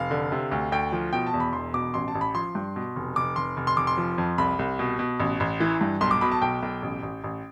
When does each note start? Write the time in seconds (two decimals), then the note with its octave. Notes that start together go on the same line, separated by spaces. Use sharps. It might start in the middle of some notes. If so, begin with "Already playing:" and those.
Already playing: F1 F5
0.11 D3
0.32 C3
0.51 D2
0.72 D2 G5
0.92 F3
1.13 B2 G5
1.27 A5
1.33 E2
1.40 B5
1.53 E1 C6
1.74 B2 D6
1.94 A1 C6
2.08 A5
2.15 A1
2.21 B5
2.35 F3 C6
2.55 G2
2.76 B2
2.96 F1
3.16 F1 D6
3.36 F1 C6
3.57 F1
3.67 C6
3.77 F1 D6
3.87 C6
3.98 F3
4.18 F2
4.38 C2 B5
4.59 C2
4.79 B2
4.99 B2
5.20 A1
5.40 A1
5.60 E3
5.81 G2
6.01 B1 C6
6.11 D6
6.21 B2 B5
6.32 A5
6.42 B1 G5
6.62 B1
6.82 A1
7.03 A1
7.24 A1